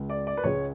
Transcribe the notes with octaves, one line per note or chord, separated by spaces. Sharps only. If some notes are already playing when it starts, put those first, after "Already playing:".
Already playing: C#2 C#3 G#3
D5
D5
B4
C#2 C#3 G#3 C#5